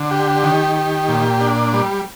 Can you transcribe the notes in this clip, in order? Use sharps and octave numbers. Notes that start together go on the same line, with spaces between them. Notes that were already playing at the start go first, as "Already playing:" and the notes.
Already playing: D3
G4
D#3
G4
A#2
D4
G3